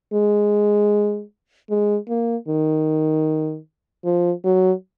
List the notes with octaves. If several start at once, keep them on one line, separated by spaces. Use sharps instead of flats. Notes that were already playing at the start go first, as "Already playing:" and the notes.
G#3
G#3
A#3
D#3
F3
F#3